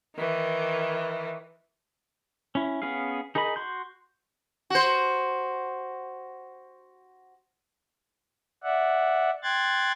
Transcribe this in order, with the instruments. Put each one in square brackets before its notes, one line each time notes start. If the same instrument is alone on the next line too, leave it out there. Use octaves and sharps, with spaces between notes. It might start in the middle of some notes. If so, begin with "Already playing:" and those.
[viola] D#3 E3
[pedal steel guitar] C#4 E4
B3 C#4 G#4 F5
D#4 G#4 A#4 D#5 B5
F#4 C6 G6
[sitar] F#4 C5
[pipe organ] D5 E5 F#5
G5 C6 F#6 G#6 A6